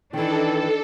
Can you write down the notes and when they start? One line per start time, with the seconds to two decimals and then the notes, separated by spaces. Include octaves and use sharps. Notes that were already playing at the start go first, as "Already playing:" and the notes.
0.13 D#3 E3 D4 D#4 A4 D5